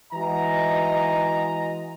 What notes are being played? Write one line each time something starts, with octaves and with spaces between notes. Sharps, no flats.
E3 G#3 F#4 D#5 A#5